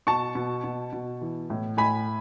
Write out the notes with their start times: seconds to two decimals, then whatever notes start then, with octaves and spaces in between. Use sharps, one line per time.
0.07 B2 A5 C#6
0.35 B2
0.64 B2
0.93 B2
1.21 E3
1.50 A2
1.77 A2 G#5 B5